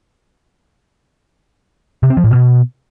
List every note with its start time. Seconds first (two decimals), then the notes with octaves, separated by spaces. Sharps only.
2.03 C3
2.10 C4
2.17 F3
2.24 A2
2.31 B2